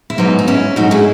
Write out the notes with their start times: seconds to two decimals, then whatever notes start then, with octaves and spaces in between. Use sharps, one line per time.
0.10 E4
0.18 G#2 F#3 B3 D#4
0.39 D#4
0.47 C#4 E4
0.76 G#2 F#3 A3 D#4 F#4
0.91 E4 G#4